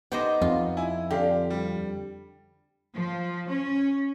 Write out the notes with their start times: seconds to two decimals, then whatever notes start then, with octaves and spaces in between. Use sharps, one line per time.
0.12 B3 D#4 G4 C5 D#5
0.42 F2 F4
0.77 E4 G#5
1.11 D3 G4 F5
1.50 G3
2.93 F3
3.48 C#4